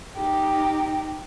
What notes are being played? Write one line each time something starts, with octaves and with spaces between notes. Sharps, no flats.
D#4 G4